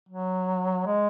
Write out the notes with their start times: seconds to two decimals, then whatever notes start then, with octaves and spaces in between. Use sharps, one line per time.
0.09 F#3
0.86 G#3